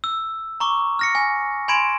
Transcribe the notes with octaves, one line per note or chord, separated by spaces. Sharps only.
E6
A#5 C#6 D6
F6 A#6 C#7
G#5
G#5 B5 C6 G#6 D7 E7